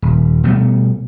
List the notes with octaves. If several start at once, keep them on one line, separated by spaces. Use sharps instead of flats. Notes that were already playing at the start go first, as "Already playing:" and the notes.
D#1
B2 G3 A3 B3